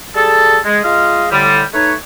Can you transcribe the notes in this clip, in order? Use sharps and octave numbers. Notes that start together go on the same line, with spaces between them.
G3 G#4 A4
G#3
G#3 F4 D#5 F5
A2 D3 G3
A3 D#4 B4 C#5